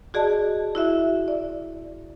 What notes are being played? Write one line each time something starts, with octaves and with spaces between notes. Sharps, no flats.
F#4 G#4 D5 D#5 A5
E4 F#4 E5
D5